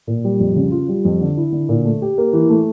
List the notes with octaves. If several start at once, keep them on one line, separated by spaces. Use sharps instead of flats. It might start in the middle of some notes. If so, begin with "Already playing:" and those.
A#2
G3
F2
C#3
F4
G3
F2
D3
E4
D3
A#2
A3
G4
A#3
E3
A3